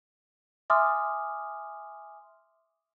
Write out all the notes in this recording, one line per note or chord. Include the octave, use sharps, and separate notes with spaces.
E5 G#5 C6 D6 D#6 F6